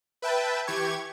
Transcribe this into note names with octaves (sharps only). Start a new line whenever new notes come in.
B4 E5 G5 A5
E3 G4 C#6 G#6